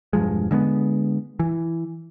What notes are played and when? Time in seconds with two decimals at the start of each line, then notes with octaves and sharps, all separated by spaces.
0.13 E1 G2 F3 G#3
0.51 D3 G#3 A#3 B3
1.40 E3